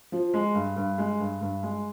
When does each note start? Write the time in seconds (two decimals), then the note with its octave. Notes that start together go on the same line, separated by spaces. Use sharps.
0.12 F3
0.34 G#3
0.54 G2
0.76 G2
0.98 G#3
1.20 G2
1.41 G2
1.63 G#3